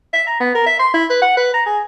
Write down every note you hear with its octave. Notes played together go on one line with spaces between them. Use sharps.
E5
A#5
B3
A#4
E5
C6
E4
B4
F#5
B4
A#5
G#4